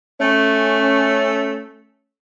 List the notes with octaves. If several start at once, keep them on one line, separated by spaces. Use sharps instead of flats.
A3 C#4